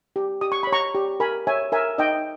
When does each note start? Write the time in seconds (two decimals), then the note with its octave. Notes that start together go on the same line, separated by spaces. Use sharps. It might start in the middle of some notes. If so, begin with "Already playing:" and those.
0.16 G4
0.41 G4 D#6
0.52 C#6
0.63 C#5 B5
0.73 A#5 C#6
0.95 G4
1.20 A#4 G#5 B5
1.47 C#5 E5 G#5
1.72 A#4 E5 G#5
1.98 D#4 D#5 G5